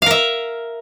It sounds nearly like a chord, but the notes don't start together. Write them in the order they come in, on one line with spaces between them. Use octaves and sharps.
F5 A#4 E5